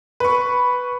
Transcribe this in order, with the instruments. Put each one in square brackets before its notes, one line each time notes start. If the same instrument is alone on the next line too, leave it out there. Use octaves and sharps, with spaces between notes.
[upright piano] B4 C#6